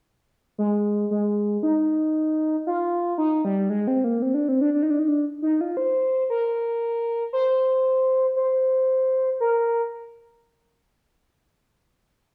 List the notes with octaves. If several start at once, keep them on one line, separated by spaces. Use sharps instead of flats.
G#3
G#3
D#4
F4
D#4
G3
G#3
C4
A#3
C4
D4
C4
D4
D4
D#4
D4
D#4
D4
D#4
F4
C5
A#4
C5
C5
A#4